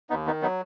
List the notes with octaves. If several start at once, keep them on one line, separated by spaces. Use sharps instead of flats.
D#2 B3 D#4
D#3 B3 D#4
F#3 B3 D#4